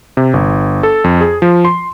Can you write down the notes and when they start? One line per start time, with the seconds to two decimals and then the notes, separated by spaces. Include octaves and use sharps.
0.17 C3
0.33 G1
0.83 A4
1.04 F2
1.21 G#4
1.42 F3
1.65 C6